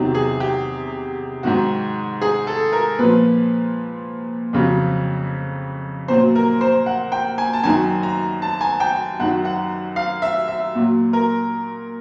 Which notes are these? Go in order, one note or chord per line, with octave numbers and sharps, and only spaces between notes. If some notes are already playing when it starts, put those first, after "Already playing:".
Already playing: E2 C3 D#3 F#3
G#4
G4
G#2 D#3 F#3 F#4
G#4
A4
A#4
A#2 F3 B4
F2 C#3 F#3
A#2 F#3 C5
A#4
C5
F#5
G5
G#5
A5
F#2 D#3 F#3 G#5
A#5
A5
G#5
G5
F#2 D#3 F#3 F#5
F#5
F5
E5
E5
A#2 F#3
A#4